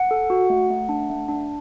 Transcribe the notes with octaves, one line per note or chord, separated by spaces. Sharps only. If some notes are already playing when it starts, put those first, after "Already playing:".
Already playing: F#5
A4
F#4
A3
A3
D4
A3
D4